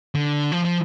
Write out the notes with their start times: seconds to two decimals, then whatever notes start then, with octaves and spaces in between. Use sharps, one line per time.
0.15 D3
0.52 F3
0.65 F3